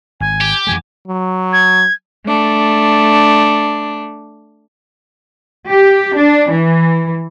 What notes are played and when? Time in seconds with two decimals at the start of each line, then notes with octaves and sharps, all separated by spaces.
0.20 G#1 G#5
0.41 G4
0.67 F2 E3 G#3 G#5
1.08 F#3
1.53 G#6
2.26 A3 D4
5.70 G4
6.17 D4
6.51 E3